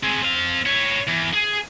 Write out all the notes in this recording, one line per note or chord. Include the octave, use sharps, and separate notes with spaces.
C4 G#4
C4 F5
E4 C#5
E2
G#4